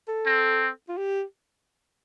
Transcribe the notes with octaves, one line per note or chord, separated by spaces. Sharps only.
A4
C4
F4
G4